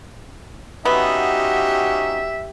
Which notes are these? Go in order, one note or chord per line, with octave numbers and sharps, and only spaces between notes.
B3 C#4 D#4 F#4 G4 E5